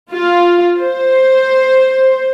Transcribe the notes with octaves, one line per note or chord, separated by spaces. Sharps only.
F4
C5